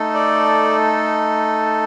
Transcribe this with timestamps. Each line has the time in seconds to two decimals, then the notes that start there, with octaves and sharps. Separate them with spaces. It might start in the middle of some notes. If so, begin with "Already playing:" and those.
Already playing: A3 D#4 A4
0.14 D5